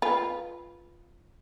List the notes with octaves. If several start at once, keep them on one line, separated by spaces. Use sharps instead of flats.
F4 B4